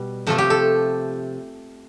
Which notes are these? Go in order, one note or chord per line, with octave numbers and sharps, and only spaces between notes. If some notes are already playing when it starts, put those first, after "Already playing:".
Already playing: B2 G3
C3 F3 A3 A4
G4
A4